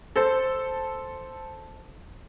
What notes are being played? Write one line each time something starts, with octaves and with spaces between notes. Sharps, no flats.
A4 C5